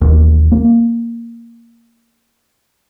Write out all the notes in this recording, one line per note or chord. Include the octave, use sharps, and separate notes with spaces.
E1 D#2
A#3